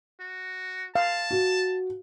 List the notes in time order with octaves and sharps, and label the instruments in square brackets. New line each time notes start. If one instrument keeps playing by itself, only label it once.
[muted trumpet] F#4
[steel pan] F5 [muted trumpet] A5
[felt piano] F#4